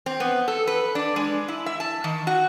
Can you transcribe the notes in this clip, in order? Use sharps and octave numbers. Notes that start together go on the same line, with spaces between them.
C4
B3
A4
B4
D4
G#3
E4
E5
A5
D#3
F#4